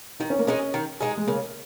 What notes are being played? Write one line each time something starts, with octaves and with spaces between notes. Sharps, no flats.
D#3 D#4
C#4
A#3
G#3 C#4 D#4 G#4
D#3
G#3 D#4 G#4
G#3
C#3 A#3